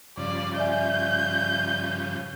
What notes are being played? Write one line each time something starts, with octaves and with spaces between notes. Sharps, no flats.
G2 C#3 F3 D5
D5 E5 G#5 G6